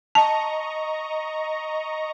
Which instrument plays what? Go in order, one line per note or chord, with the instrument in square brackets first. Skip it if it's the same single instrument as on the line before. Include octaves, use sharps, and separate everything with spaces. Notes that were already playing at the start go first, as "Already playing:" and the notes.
[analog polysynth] D#5 A#5 C#6 [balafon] A5